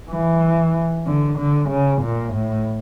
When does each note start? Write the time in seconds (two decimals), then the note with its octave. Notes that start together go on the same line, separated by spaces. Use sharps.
0.10 E3
1.06 D3
1.38 D3
1.70 C#3
2.02 A#2
2.34 A2